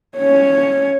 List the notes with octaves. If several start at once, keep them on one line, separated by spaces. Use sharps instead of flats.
C#4 C#5